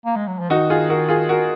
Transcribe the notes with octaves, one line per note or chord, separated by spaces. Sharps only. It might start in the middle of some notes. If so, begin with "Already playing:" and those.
A#3
G#3
F#3
F3
D#3 D#4 F#4
F4 G#4
F#4 A#4
F4 G#4
F#4 A#4